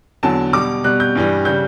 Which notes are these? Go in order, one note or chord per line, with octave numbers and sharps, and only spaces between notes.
E2 D3 F#3 A5
B2 G3 D6
B2 G3 F#6
G6
G2 E3 G3
C#3 G3 G6